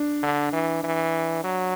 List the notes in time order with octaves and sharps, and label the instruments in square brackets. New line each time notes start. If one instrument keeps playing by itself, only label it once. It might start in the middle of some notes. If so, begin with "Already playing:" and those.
Already playing: [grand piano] D4
[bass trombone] D3
E3
E3
F#3